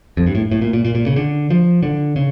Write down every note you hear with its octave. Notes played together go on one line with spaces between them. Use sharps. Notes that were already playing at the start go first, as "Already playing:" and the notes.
F2
G2
A2
A2
A#2
A#2
A#2
A#2
C#3
D3
F3
D3
C#3